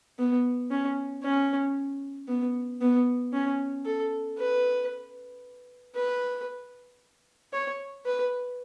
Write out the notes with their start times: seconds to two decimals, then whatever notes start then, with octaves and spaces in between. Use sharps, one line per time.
0.19 B3
0.71 C#4
1.23 C#4
2.28 B3
2.81 B3
3.33 C#4
3.85 A4
4.38 B4
5.96 B4
7.53 C#5
8.05 B4